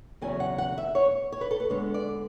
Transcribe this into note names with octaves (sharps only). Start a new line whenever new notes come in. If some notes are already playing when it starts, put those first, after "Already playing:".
E2 C#3 F#3 C#4 G#5
F#5
F#5
E5
C#5
C#5
B4
A4
B4
D3 G#3 B3 C#5
D5